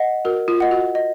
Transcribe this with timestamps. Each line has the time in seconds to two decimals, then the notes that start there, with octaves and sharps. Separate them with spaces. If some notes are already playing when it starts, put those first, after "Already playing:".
Already playing: D#5 F#5
0.25 F#4 A#4
0.48 F4
0.60 D#5 F#5
0.71 F#4
0.95 D#5